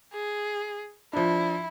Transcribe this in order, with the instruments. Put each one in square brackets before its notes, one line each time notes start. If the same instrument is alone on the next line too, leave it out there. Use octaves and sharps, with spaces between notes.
[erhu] G#4
[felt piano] F3 D4 [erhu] E4